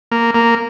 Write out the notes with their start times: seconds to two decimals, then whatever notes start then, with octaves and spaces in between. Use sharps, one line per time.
0.12 A#3
0.35 A#3